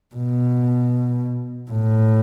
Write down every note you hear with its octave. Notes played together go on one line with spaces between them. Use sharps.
B2
A2